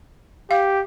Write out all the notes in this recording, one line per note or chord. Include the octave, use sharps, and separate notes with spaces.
G4 F5